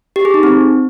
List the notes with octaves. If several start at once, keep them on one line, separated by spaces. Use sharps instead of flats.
G4
G#4
D#4
C4